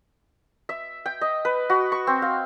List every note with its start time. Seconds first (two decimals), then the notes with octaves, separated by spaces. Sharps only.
0.69 E5
1.06 G5
1.21 D#5
1.45 B4
1.70 F#4
1.92 C#6
2.07 C4
2.22 F5